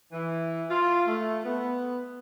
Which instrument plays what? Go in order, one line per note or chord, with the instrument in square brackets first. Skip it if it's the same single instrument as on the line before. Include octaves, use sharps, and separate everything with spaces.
[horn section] E3
F4
A3
B3